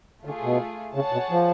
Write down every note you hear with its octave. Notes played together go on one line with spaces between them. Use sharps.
D3 A3 F4 G#4
B2
C#3 G#4 C#5 F#5 A5
B2
F3